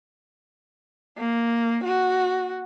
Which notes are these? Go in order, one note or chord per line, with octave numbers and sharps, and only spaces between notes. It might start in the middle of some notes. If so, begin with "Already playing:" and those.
A#3
F#4